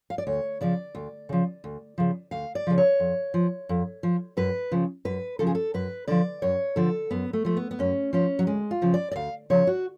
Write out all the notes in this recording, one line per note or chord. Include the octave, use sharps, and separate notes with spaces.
F5
D5
D2 C#5
C#3 F3 D5
D2
C#3 F3
D2
C#3 F3
D2 F5
D5
C#3 F3
C#5
F2
F3
F2
F3
F#2 B4
C#3 F3
F#2 B4
C#3 F3 A4
G#4
A4
F#2 B4
D3 F3 D5
F#2 C#5
D3 F3 A4
F#2 B3
A3
F3 A3
B3
B3
F#2 C#4
F3 C#4
F#3
D2 G#3
F4
C#3 F3
D5
D5
D2 F5
C#3 F3 C#5
F#4